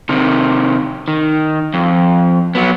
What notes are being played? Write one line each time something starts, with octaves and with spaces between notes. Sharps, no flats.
C3 D#3
D#3
F2
F#3 B3